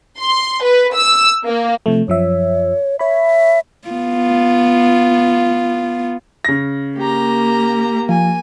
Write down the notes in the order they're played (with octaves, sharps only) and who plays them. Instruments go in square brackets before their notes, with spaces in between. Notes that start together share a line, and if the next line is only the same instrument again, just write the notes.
[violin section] C6
B4
E6
A#3
[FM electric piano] C3 F3 A3
[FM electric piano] F#2 F3 E5 [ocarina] C#5
[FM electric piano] C#5 B5 [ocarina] E5
[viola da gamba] B3 F4
[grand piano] C#3 A#6
[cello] A#3 [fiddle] G4 A#5
[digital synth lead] F3 [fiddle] G#5